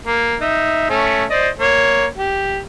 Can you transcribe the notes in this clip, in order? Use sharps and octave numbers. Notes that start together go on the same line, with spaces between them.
A#3
D#4 E5
A3 C#4
C5 D5 D#5
A#3 C#5
G4